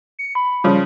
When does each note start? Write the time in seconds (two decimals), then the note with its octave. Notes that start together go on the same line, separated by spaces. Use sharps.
0.19 C#7
0.35 B5
0.64 C#3 F3 G3